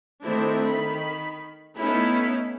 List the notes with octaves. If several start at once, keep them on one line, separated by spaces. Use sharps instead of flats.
D#3 A3 C4 D4 E4
D#3 B5
A3 B3 C#4 D#4 E4 B5